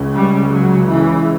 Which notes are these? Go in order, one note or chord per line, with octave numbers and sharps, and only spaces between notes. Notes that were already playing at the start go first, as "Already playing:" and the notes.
Already playing: C#2 C#3
G3
F#3
E3